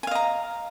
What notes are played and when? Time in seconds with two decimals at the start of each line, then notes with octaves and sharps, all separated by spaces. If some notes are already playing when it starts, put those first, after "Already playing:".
0.03 G#5
0.07 F5
0.11 D#5
0.15 A#5